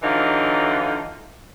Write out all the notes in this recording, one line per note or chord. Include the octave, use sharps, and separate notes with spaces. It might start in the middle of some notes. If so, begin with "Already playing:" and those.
D3 E3 F#3 D#4 F4